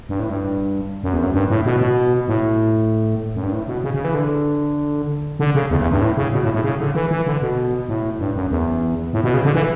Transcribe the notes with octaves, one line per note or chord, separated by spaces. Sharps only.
G2
A2
G2
F#2
E2
F#2
G2
A2
B2
B2
A2
F#2
G2
A2
B2
C#3
C#3
E3
D3
D3
C#3
E2
E2
G2
A2
C#3
B2
A2
A2
C#3
D3
E3
E3
D3
B2
A2
G2
F#2
E2
A2
B2
C#3
D3
E3